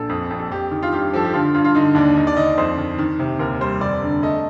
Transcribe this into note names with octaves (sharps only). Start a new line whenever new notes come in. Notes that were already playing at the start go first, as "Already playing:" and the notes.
Already playing: A#1 A4
F2
F2
A4
F2 G4
D#3
F4
G2 G4
F3 A4
G4
D3 F4
G2 F4
F4
D3 D#4
D#2 D4
D#3 D#4
D5
D#3 D#5
D5
F2 C5
D#3
D#3
C3
D#2 A#4
G3 C5
F1 D5
D3
A3 D#5